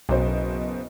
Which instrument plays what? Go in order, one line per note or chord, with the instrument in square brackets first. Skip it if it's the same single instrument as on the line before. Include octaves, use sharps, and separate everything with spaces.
[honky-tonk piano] F#1 B2 C5 [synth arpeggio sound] B1